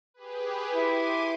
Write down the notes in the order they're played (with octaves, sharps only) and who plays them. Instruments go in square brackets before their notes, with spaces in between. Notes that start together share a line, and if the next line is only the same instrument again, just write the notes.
[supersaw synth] G4 G#4 B4
[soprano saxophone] E4 [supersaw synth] C6 D6 D#7